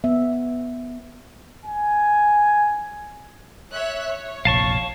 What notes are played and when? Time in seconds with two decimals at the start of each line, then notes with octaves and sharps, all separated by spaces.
0.04 B3 E5
1.66 G#5
3.72 C#5 E5 F#6
4.07 C#5
4.45 F1 A#1 F5 A5 C#6